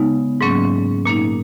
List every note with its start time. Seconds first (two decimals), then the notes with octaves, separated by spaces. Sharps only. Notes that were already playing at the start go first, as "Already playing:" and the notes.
Already playing: C#3 G#3 B3 D#4
0.41 G#2 F#3 A#3 C#4
1.06 A#2 A#3 D#4